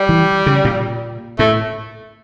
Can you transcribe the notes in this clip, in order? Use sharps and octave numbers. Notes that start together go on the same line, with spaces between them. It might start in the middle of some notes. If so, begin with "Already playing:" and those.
Already playing: G3
E3
C#3
A#2
A2 A3